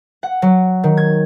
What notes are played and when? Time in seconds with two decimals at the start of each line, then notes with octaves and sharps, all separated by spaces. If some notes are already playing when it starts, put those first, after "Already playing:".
0.23 F#5
0.42 F#3
0.84 D#3
0.97 G#6